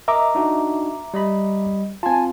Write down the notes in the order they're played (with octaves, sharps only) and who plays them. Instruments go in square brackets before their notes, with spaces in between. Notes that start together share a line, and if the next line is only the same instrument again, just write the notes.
[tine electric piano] A#4 D#5 [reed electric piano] E5 A#5 D6
[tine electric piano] D4 D#4 F#4
G3 D#5 B5
[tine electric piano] C4 F4 [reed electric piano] G#5 A5